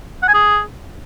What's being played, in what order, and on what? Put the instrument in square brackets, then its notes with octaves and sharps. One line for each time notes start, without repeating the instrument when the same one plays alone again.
[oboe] F#5
G#5
G#4